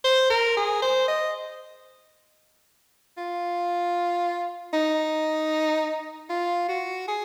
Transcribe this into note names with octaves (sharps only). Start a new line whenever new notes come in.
C5
A#4
G#4
C5
D#5
F4
D#4
F4
F#4
G#4